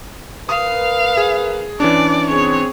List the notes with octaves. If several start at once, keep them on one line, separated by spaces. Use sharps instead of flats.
A#4 B4 F5 D#6
G#4
E3 C#4 D4 D5
C4 G#4 C#5